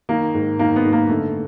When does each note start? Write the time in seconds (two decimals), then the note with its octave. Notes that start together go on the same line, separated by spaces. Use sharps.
0.09 D#3 A#3
0.34 G#2
0.59 D#3 A#3
0.76 B3
0.84 G#2
0.93 A#3
1.09 D3 A3